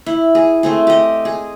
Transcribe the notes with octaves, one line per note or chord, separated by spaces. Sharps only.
E4
G#4
A3 C4 G#4
G4 D#5
G#4